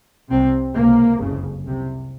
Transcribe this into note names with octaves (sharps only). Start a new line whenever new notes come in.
C2 C3 C4
C#2 C3 A#3
F#1 F2 C#3
C2 C3